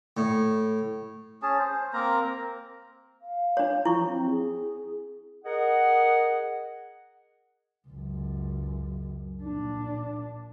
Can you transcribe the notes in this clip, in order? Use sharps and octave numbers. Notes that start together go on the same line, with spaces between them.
A2
C#4 G#4 A5
C5
A#3 C4 A#4 A#5
F5
D4 C#5
F3 E4 C#6
C4
G#4
G#4 A#4 D#5 F#5
C#2 F#2
A#1 D4